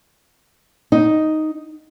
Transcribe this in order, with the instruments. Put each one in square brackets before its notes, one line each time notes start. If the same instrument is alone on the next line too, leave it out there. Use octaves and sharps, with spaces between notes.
[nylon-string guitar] D#4